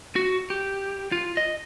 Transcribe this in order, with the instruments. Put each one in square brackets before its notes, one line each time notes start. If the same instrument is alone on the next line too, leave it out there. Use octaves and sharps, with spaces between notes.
[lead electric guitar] F#4
G4
F4
D#5